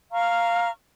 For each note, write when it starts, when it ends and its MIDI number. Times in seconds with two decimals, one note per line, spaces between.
0.12 0.69 77
0.12 0.69 82
0.12 0.69 85
0.12 0.69 89